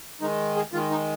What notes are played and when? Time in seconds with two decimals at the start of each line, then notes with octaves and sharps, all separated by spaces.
0.21 D#3 G#3 D#4
0.56 G#4
0.73 D#3 G#3 F4
0.91 D#4